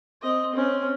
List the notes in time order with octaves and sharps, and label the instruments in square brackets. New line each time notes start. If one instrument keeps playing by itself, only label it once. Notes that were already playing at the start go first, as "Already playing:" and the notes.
[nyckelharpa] C4 D#5
C4 C#4